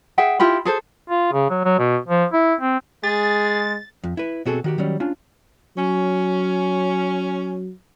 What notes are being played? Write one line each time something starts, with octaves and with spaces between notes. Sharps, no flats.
G#4 E5 F#5 G5
E4 F4 G4 B5
G#4 A4 C5
F4
C#3
F#3
F#3
B2
F3
E4
C4
G#3 G#4 A6
F2
E4 B4
B2 C4 F#4 G#4 A4
D#3 F#4 G4
D#3 F#3 G3 C#4
C#4 D4 F4
F#3 C#4